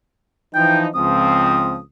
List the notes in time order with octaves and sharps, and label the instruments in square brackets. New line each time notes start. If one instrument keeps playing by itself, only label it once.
[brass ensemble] E3 F3 D#4 [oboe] G5
[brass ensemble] C#2 F3 C4 [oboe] D#6